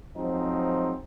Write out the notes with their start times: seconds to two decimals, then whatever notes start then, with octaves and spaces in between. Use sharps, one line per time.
0.15 F3 F#3 G#3 C4 D#4